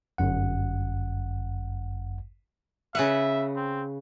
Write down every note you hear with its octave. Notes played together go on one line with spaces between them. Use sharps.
G1 F#2 F#5
C#3 B4 E5 F#5
C4